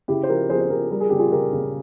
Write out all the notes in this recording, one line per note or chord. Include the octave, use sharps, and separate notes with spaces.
C#3 E4 G4
C5
F3 G4 A#4
F3 G#4 C5
C5
F3 G4 A#4
G3 A#4
G#4
C#3 G4
F4 G#4
C#3 G4 A#4
C#3